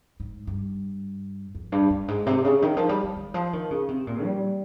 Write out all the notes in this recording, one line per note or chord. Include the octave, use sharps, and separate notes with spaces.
G#2
G2
F2
G2
G2
G#2
C3
C#3
D#3
F3
G3
G3
D#3
F3
D#3
C#3
C3
A#2
G3